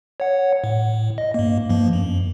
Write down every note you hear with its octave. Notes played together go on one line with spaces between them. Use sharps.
C#5 F#5
A2
D#5
G2 A#3
G2 F3 A#3
F#2